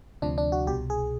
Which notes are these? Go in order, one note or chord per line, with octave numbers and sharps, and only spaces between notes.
D2 C3 F3 D4
D4
F#4
C2 B2 G4
G#4